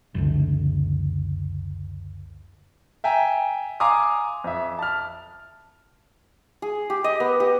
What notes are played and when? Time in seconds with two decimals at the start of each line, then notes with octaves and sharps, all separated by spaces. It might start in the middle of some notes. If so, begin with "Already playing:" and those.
0.15 F#1 C#2 D3
3.04 E5 G5 G#5 A#5
3.80 F5 G#5 A#5 C6 D6 D#6
4.44 F2 E5
4.79 A5 F6
6.62 G#4
6.90 G4
7.04 D#5
7.20 B3
7.40 G4